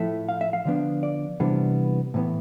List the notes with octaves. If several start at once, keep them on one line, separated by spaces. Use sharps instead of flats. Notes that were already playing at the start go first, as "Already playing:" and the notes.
Already playing: A2 F3 A3 E4 E5
F5
E5
F5
D3 F3 B3 D4
D5
C3 E3 G3 B3 D4
A2 E3 B3